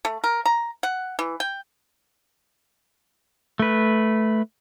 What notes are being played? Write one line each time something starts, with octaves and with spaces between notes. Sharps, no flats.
A3
A#4
A#5
F#5
E3
G5
A3 B4